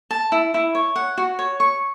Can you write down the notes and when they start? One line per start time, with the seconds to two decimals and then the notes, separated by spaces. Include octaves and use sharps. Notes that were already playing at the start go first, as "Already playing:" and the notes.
0.11 A5
0.32 E4
0.54 E4
0.75 C#5
0.96 F#5
1.18 F#4
1.39 C#5
1.60 C#6